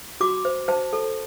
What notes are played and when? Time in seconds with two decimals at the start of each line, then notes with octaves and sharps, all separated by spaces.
0.21 F#4 D6
0.45 C5
0.68 C5 A5
0.93 A4